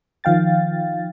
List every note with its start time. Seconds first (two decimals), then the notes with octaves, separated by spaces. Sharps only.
0.24 D#3 F3 F5 G5 A6